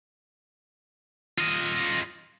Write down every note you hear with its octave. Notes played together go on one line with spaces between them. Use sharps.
F4 D#5